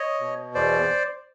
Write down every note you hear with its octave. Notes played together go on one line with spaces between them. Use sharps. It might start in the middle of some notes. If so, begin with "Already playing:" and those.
Already playing: C#5 D#5
B2
E2 C5 D5